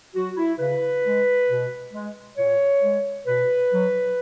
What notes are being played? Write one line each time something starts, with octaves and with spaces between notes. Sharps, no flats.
F#3 F#4
E4
C#3 B4
G#3
B2
G#3
A#2 C#5
G#3
B2 B4
F#3